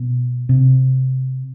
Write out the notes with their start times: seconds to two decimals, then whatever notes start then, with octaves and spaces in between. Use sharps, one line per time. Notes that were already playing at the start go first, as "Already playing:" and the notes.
Already playing: B2
0.49 C3